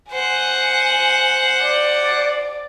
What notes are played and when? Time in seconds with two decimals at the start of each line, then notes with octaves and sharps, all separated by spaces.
0.12 C5 F#5 G#5
1.62 D5